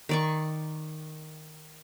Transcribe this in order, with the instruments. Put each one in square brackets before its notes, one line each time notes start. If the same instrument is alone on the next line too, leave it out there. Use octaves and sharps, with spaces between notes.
[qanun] D#3 D5 C#6